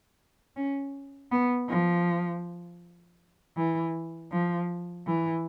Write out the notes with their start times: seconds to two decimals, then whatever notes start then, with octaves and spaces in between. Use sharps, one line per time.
0.56 C#4
1.31 B3
1.69 F3
3.57 E3
4.32 F3
5.07 E3